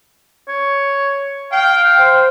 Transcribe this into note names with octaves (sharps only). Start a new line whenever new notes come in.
C#5
F5 G5
C5